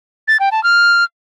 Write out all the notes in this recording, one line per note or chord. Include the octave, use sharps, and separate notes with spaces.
A6
G5
A5
F6